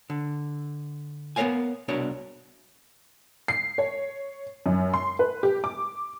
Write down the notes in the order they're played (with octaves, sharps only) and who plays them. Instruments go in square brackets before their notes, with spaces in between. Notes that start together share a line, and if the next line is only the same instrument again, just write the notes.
[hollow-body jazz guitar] D3
B3 A#4 B4 C#5 F5 G#5
C2 B2 D4 A#4 C#5
[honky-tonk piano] C7
C#5
F#2
C6
B4
G4
D6